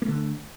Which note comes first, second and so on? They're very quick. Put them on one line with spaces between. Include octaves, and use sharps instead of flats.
A#3 A3 D3